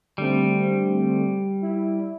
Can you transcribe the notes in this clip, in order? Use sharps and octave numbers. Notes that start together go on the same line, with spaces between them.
D3 G3 A3 C4
E4